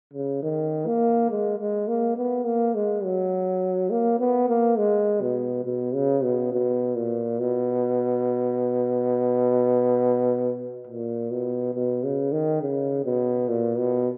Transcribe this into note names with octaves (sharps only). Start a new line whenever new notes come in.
C#3
D#3
A#3
G#3
G#3
A#3
B3
A#3
G#3
F#3
A#3
B3
A#3
G#3
B2
B2
C#3
B2
B2
A#2
B2
A#2
B2
B2
C#3
D#3
C#3
B2
A#2
B2